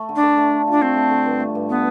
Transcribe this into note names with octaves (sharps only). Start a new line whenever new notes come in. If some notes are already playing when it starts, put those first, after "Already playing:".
Already playing: A3
D3
D4
D3
A3
A3
D4 F4
A3 C4
A3
D3
G2
A3
G2
D3 B3